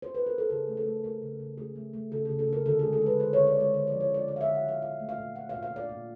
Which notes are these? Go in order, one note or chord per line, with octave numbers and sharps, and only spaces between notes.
C5
B4
A#4
A4
C#3 G#4
A3
A4
A3
A3 A#4
C#3
C#3
A3 G#4
A3
A3
C#3 A4
C#3 G#4
A4
C#3 A#4
D3 A4
G#3 G#4
A4
G#3 B4
D3 C5
D3 C#5
D5
G#3 C#5
D3 C5
F3 D5
C#5
G#3 D5
D3 D5
F5
D3 E5
F#5
F3 F5
A#2 F5
A3
F5
A#2
A#2 F#5
F5
A#2
F5
A#2 D5
A#2